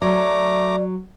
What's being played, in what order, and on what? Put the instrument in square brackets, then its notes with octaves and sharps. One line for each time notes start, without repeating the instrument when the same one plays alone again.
[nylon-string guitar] F#3 [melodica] A3 A#5 D6 [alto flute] D5